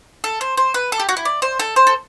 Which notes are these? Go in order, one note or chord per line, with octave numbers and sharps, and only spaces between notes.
A4
C5
C5
B4
A4
G4
F#4
E4
D5
C5
A4
C5
A4